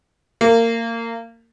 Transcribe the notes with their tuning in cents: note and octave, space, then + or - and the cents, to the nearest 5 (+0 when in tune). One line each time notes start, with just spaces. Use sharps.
A#3 -25